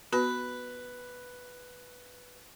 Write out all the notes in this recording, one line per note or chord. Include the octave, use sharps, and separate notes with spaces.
B3 F#4 B4